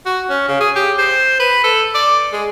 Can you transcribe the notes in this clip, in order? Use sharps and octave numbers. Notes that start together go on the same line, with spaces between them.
F#4
C#4
C#3
G#4
G4
C5
B4
A4
D5
G#3